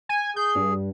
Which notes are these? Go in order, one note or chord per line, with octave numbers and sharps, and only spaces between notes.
G#5
G#4 G6
G2